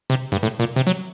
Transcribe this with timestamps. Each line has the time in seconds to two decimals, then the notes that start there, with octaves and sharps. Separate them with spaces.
0.10 C3
0.32 G2
0.43 A2
0.60 A#2
0.76 C3
0.87 F#3